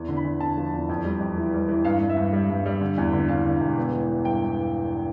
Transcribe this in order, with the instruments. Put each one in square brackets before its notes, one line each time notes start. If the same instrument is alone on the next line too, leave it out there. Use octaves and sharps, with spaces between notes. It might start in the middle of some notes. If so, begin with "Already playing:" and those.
Already playing: [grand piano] E2
D3
B5
E2
D3 A5
F3
E2
F2
G3
F2
E3
G3
E3
G2 F5
G2
E5
G2
G3
G2
G3
D3
E2
D3
E2 F5
D3
E1
B3
E3
E3
G2 G5
E3